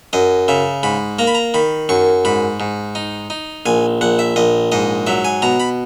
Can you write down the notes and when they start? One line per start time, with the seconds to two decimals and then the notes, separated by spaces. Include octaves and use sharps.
0.13 F#2 D#5
0.48 C#3 E5
0.83 G#2 B5
1.19 A#3 A#5
1.27 B5
1.35 A#5
1.54 D#3 B5
1.89 F#2 C#6
2.25 G#2 B5
2.60 G#2
2.95 D#4
3.30 D#4
3.66 A#1 G#5
4.01 A#1 F#5
4.19 E5
4.36 A#1 D#5
4.72 G#2 D#5
5.07 F#3 E5
5.25 G#5
5.42 B2 A#5
5.60 B5